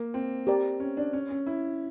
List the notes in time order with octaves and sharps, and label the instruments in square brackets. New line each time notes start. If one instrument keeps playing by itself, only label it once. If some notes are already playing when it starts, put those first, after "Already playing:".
Already playing: [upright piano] A#3
C4
[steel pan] G4 A#4 D5
[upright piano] C#4
D4
C#4
C#4
E4